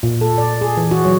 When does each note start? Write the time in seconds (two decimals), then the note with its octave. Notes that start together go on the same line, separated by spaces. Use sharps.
0.03 A#2
0.21 A4
0.38 D5
0.61 G#4
0.77 E3
0.91 F#4
1.05 F#3